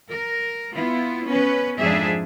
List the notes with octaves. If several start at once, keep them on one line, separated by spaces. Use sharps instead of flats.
A#4
B3 E4 F4
B3 C#4 B4
F2 G#2 F3 D4 G#4 E5